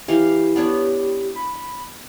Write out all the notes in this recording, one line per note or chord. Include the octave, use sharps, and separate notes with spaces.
E3 G4 F5
B3 D4 C#5
B5